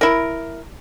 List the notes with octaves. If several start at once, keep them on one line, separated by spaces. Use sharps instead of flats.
E4 A#4